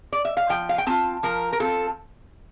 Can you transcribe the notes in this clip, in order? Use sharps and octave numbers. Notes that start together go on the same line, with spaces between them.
D5
E5
F5
F3 G5
F5
G5
C4 F4 A5
F3 A#4
A#4
C4 F4 A4